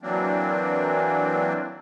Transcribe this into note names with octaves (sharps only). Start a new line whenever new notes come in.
E3 F#3 A#3 C4 D4